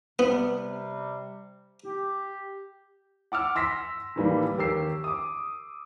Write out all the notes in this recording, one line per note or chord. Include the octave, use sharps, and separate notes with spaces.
C3 G3 B3
G4
F#5 D6 E6 F6
C6 E6 A#6 B6
A2 D#3 E3 G3 A#3
D#2 G4 A#4 E6 C7
D6 D#6